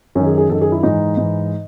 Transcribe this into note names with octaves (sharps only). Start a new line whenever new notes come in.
F#2 D#3 C#4
G#4
G#4
F#2 D#3 A4
G#4
E4
G#2 E3 D#4
G#2 E3